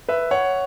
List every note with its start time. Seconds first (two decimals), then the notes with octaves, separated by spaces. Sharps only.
0.09 B4 E5
0.31 C#5 F#5